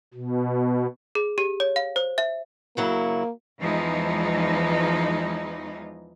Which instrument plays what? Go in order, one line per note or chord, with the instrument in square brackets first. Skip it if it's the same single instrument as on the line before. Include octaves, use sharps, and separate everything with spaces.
[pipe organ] B2
[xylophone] G#4
G4
C#5
F5
C5
E5
[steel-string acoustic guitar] C#3 F#3 E4 [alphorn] A#3
[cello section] E2 E3 F3 G#3 D#4